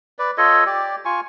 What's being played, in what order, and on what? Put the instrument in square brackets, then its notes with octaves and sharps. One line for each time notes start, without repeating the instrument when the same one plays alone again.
[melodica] B4 D5
F4 A4 C#5 D#5
G4 D5
F4 G#5 C#6